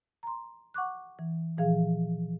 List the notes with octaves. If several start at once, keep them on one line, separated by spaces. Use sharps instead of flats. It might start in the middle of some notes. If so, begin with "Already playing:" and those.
A#5 C6
F#5 C#6 D6 F#6
E3
A#2 E3 F3 G#4 F5